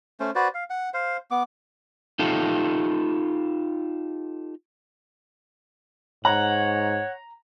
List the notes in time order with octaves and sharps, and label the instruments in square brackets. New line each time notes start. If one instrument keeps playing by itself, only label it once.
[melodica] A3 C#4 C5
F#4 B4 C5 D5
F5
F#5
C5 F5
B3 D6
[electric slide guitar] D#4 F4 G4 A4
[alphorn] G#2 [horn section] C#5 [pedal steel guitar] F#5 [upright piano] A#5